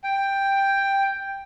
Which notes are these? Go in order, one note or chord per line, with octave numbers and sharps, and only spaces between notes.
G5